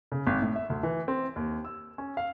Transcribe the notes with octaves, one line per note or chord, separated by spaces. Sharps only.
C#3
G#1
A2
E5
D2
E3
C4
D#2
E6
C#4
F5